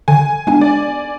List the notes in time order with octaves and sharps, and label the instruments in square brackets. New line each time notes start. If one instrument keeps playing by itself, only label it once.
[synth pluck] D3 [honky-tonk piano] G#5
[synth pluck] G#3 B3 D4 [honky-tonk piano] G#5
[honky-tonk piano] D5